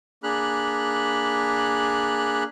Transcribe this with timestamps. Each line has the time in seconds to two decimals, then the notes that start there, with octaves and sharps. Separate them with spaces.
0.23 A#3 D4 G#4 B5 F6 F#6